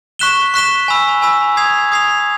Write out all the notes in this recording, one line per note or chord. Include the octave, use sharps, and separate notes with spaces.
C#6 F#6 B6 E7 G7
C#6 F#6 B6 E7 G7
G#5 B5 E6
G#5 B5 E6
D#6 G#6 C7 F7
D#6 G#6 C7 F7